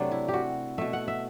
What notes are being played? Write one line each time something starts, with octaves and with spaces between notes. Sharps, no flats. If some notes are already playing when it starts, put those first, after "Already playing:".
Already playing: C3 F#3 A3 D4
E4
F#4 G4
B2 A3 E5
F#5
E5